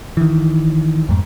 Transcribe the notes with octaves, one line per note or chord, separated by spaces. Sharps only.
D#3 E3
F2 G#2